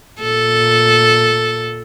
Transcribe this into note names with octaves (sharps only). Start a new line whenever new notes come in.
A#2 A4